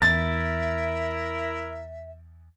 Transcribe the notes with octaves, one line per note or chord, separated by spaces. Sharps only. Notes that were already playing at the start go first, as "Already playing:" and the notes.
E2 E4 A#4 E5 A6